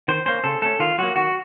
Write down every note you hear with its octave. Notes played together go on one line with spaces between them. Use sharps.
D#3 C5
A#3 C#4 C5
C#3 A4
A3 C#4 A4
D#3 F4
F#3 A#3 F#4
D#3 F#4